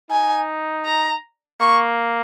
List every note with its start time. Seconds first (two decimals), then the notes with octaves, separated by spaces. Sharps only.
0.10 D#4 G#5
0.86 A#5
1.60 A#3 C#6